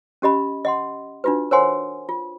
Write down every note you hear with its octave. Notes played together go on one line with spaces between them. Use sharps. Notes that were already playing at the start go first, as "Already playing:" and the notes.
C#4 G4 D#5 B5
D#5 F#5 C6
D4 D#4 F4 F#4 B4
A#4 C5 C#5 F#5 G#5 C6
F4